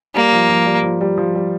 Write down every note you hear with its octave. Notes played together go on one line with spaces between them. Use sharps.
G3 A#3
F3
F3
G3
F3
G3
F3
G3